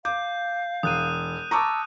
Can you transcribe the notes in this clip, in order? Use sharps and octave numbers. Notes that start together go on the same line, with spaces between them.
F5 D6 G6
E1 D#6 F#6 D#7
A5 A#5 C#6 D6 E6